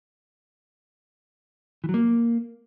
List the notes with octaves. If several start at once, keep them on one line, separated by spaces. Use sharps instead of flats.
E3
F#3
A#3